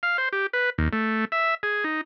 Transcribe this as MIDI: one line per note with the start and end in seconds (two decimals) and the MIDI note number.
0.03 0.17 77
0.18 0.29 72
0.33 0.47 67
0.53 0.70 71
0.78 0.89 39
0.93 1.25 57
1.32 1.55 76
1.63 1.84 68
1.84 2.01 63